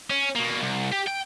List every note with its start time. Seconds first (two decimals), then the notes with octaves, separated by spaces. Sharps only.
0.10 C#4
0.35 B2 A#3
0.61 C2
0.92 G4
1.07 G5